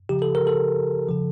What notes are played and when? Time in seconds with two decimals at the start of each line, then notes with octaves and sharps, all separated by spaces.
0.09 C#3 F3 G4
0.22 A4
0.35 A#4
0.47 A4
1.09 C#3 F3